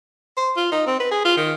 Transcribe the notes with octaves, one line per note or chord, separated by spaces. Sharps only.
C5
F4
D#4
C4
B4
G#4
F4
D#3